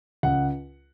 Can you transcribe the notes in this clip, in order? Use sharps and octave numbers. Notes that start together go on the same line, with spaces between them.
C#2 F#5